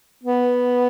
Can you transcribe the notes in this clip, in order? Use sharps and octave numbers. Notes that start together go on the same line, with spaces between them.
B3